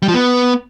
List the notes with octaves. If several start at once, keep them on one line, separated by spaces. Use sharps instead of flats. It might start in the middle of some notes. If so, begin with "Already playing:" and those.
G3
F3
B3